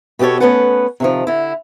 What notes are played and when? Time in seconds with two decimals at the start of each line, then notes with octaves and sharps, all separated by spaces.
0.19 B2 B3 G4 A4 C#5
0.40 A3 B3 C#4 A4 B4 F#5
1.00 C3 D#3 F3
1.27 D3 E4